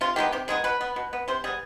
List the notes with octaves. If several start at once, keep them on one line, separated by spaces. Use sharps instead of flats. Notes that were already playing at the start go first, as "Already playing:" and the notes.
C3 F4
D#3 G#3 B3 G4
C3 G4
D#3 G#3 B3 G#4
B2 B4
B3
B2
B3
C3 C5
G3 B3 G#4